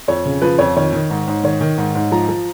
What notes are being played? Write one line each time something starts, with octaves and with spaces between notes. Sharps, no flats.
F2 C#5
C#3
F3 B4
F2 C#5
D#3 C#5
D#3
G#2
G#2
D#3 C#5
D#3
G#2
G#2
F3 A#5
F3